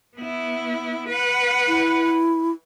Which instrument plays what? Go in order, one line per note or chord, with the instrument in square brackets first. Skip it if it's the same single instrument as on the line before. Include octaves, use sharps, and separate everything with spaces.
[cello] B3 E4
B4 F#5
[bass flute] E4